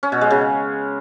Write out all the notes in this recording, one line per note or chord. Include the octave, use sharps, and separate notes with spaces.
C#4
B2
G#3
C#3